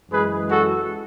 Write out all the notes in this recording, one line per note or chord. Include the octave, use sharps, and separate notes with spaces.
F#2 E3 G#3 G#4 B4
F#4 A4